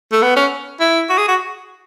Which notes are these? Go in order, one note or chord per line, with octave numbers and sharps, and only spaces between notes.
A3
B3
C#4
E4
F#4
G#4
F#4